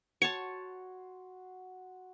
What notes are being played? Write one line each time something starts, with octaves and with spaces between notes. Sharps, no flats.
F#4 C#5 A5 C6 C#7